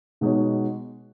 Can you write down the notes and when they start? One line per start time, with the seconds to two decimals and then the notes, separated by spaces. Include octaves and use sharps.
0.21 B2 G#3 D#4 F#4 C#5